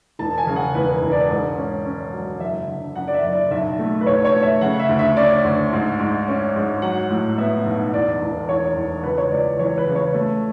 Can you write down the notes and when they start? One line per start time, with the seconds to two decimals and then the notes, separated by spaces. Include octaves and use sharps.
0.19 E1 A5
0.38 G#5
0.47 C#3
0.56 F#5
0.75 E1 B4
1.02 E1
1.12 D5
1.30 G#2
1.57 C#4
1.85 C#4
2.13 F#3
2.40 F#1 E5
2.68 D3
2.95 F#2 F#5
3.08 D5
3.14 E5
3.23 F#1
3.33 D5
3.51 B1 E5
3.79 A3
4.01 B4
4.06 B1 C#5
4.25 C#5
4.34 A3
4.42 E5
4.61 C#3 F#5
4.79 E5
4.89 D2
4.99 E5
5.17 C#4 D5
5.44 D2
5.73 G#2
5.99 G#2
6.28 C#4
6.56 G#2
6.82 F#3 F#5
7.10 A2
7.38 B3 E5
7.65 B1
7.93 E2 D5
8.21 E1
8.48 E2 C#5
8.76 E2
9.04 C#2 B4
9.18 C#5
9.31 C#2 D5
9.59 E3 C#5
9.78 B4
9.87 C#3
9.96 C#5
10.14 A3